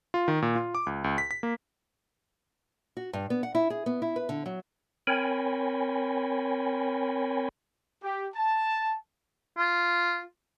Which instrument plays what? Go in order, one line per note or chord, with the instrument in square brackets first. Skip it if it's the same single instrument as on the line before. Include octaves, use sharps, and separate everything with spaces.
[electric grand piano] F4
D#3
A#2
F4
D6
C#2
C#2
B6
B6
A#3
[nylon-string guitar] F#4
G2
B3
F#5
E4
G#4
B3
E4
B4
D3
F#3
[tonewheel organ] C4 A#4 C#5 G5 G#5 B5
[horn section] G4
A5
[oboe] F4